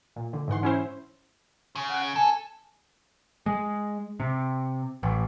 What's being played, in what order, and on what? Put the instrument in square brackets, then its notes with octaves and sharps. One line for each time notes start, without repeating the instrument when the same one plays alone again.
[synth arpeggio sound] A#2
D3
G#2 E3 F#5 C6
C#4 E4 C5
[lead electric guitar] C#3
[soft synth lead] F#5
G#6
[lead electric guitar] A4 [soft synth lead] G#5
[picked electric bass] G#3
C3
A1